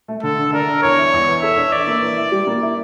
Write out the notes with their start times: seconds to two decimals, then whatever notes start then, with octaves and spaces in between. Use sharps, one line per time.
0.08 A3
0.23 D3 A4
0.38 D3
0.53 D4 A#4
0.68 D4
0.83 E2 C#5
0.98 E4
1.13 E2
1.27 E3
1.42 A4 E5
1.57 D4
1.72 E3 D5
1.87 A#3
2.02 E3
2.17 E4
2.32 G3
2.47 A#3
2.62 E4